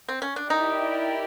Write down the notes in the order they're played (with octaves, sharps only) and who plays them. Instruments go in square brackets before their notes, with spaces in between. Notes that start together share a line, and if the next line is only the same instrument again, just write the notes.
[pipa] C4
C#4
D4
[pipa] D#4 [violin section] E4 G4 A#4 D5